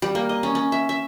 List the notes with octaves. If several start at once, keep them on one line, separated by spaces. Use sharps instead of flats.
G3
A#3
D#5
C#4
C#4
E5
E5